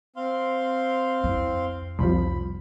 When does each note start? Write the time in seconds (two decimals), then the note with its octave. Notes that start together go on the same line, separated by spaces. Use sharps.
0.16 C4 F5 C6
1.24 F2 E4
1.99 F1 C2 F3 B5